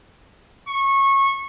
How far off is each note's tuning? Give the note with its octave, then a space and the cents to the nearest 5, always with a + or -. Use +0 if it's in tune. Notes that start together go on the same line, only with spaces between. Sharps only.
C#6 -20